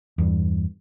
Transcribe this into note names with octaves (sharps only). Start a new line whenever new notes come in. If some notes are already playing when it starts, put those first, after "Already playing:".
E2 G2